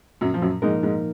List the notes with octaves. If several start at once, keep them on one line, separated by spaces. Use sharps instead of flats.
F#2 A#2 F#3
F3
F#2 F#3
G#2 F3 G#3 A#3 D#4 A#4
G#2 G#3